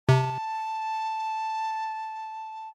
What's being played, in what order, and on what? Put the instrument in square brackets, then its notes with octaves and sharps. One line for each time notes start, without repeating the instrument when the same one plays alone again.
[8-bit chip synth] C3 [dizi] A5